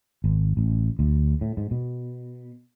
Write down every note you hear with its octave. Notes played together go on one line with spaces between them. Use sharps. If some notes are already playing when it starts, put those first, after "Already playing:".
G#1
A1
D2
A2
G#2
B2